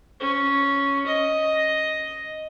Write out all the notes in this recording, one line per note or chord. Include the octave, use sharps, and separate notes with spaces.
C#4
D#5